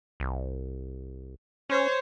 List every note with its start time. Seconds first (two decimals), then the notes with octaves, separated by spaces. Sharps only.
0.20 C2
1.70 C#4 C5 C#5